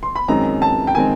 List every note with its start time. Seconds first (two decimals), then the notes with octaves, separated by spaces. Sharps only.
0.03 C6
0.15 B5
0.28 F#2 D#3 G#3 C4 A#5
0.62 A5
0.87 G5
0.95 D#3 G#3 C4 G#5